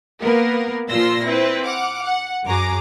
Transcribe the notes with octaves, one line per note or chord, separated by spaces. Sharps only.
A#3 B3 A#4 B4
A#2 F3 F4 C6 E6 A#6
C4 E4 B4 C5
F#5 D6 F6
F#5
F#2 F#4 G#4 A#5 D6